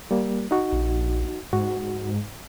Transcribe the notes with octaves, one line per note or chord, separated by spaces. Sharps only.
G3 A#3
D#4 F#4
A#1
G#2 F#4